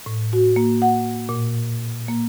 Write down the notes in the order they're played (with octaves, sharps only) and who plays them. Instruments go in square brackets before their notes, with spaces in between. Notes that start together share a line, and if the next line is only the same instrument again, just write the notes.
[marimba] A2
F#4
A#3
F#5
A#2
A#3